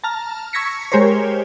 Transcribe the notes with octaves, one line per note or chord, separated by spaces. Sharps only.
A5 A#5 F6
C#6 E6 G#6 A#6 B6 C#7
G#3 G4 A#4 C5 C#5